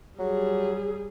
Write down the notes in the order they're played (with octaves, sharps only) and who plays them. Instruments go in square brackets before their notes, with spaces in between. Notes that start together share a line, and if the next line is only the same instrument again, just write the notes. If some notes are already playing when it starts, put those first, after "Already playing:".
[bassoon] F#3 [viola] G3 G#4